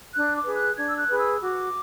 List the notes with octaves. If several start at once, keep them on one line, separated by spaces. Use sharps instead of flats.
D4 F#6
D6
G#4 B4
F#6
D4 G#6
E6
F#6
G#4 B4
E6
F#4 D6